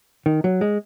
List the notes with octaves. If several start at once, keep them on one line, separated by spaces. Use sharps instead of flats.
D#3
F#3
G#3